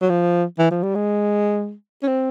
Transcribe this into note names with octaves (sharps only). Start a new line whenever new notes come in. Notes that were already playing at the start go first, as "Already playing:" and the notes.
F#3
F3
E3
F3
G3
G#3
C#4
C4